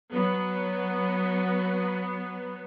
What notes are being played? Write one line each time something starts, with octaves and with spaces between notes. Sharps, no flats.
F#3 B3